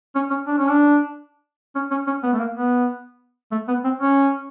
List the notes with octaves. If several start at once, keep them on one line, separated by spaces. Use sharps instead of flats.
C#4
C#4
D4
C#4
D4
C#4
C#4
C#4
B3
A3
A#3
B3
A3
B3
C4
C#4